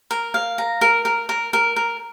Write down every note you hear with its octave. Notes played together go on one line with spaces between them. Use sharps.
A#4
F5
A#5
A#4
A#4
A#4
A#4
A#4